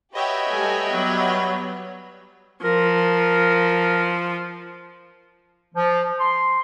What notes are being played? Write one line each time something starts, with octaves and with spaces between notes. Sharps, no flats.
F#4 G4 B4 C#5 D#5 E5 G5
G3 A3 G#5
F#3 G3 B3
F3 A#4
F3
C6